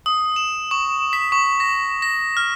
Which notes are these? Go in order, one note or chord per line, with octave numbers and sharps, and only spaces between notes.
D#6
E7
C#6
B6
C#6
A#6
A#6
F6